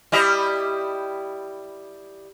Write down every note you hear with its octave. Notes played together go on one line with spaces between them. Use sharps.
G3 E4 D#5